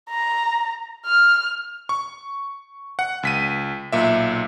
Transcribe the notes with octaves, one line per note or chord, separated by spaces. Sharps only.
A#5
F6
C#6
F#5
C#2 B6 D#7
B1 A#2 E5